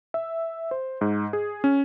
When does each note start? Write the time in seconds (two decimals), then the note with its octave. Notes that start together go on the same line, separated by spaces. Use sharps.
0.14 E5
0.71 C5
1.01 G#2
1.33 G#4
1.64 C#4